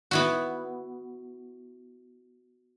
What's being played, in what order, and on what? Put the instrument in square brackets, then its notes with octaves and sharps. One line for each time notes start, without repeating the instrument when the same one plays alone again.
[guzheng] B3 E4 F#4